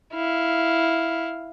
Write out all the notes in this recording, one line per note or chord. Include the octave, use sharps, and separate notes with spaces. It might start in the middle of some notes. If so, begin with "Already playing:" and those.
E4 F5